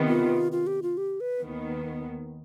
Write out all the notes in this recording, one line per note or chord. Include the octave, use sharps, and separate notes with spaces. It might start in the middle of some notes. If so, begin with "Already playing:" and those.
Already playing: C3 D#3 B3
F4
F4
G4
F4
G4
B4
D#2 D#3 B3